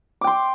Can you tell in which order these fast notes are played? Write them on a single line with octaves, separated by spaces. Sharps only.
D6 G5 C6